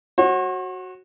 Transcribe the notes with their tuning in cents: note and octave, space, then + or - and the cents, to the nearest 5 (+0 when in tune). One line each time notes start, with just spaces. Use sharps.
F#4 +0 C#5 -45